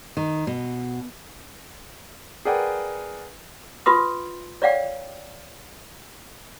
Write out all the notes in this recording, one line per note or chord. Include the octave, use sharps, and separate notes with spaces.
D#3
B2
G#4 A#4 B4 D5 F#5 G5
F4 B4 C6 D#6
C#5 D5 F5 G5